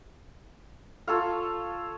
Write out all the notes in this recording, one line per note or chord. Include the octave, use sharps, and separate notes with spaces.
F4 A4 C#5 F5